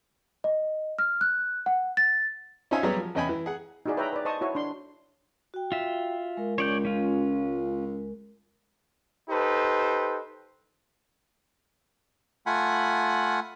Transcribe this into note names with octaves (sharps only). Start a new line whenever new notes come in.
D#5
F6
F#6
F#5
A6
C#4 D#4 F4 C5 E5 G#5
F#3 G3 B3 G4 G#4 C#5
F3
E2 C#4 D#5 G5 G#5 B5
E3
G#4 F#5
D#4 E4 F#4 G#4 D5
B4 C#5 E5 G5 A#5 B5
B4 D5
C5 D#5 A5 C#6 D#6
E4 F#4 C#5
D4 C6
F#4 G5
F4 E5
G#3 A#4
C#2 C#5 D5 G6
C#4 F4
D#4 G4 A4 B4 C5
A3 F4 F#5 G#5 B5